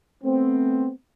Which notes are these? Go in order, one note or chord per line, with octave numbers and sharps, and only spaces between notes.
A3 B3 C4